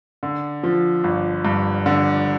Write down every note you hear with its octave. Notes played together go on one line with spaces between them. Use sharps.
D3
F3
G1
G2
D3